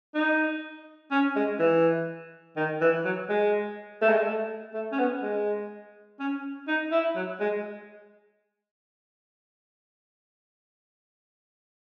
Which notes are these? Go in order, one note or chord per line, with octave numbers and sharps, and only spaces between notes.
D#4
C#4
G#3
E3
D#3
E3
F#3
G#3
A3
G#3
A3
A3
C#4
B3
G#3
C#4
D#4
E4
F#3
G#3